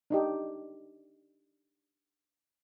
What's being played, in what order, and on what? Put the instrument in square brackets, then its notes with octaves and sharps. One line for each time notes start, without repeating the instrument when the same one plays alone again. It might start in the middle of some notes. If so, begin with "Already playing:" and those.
[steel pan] D4 D#4 G4